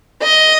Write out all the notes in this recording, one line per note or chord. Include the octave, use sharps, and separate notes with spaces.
D#5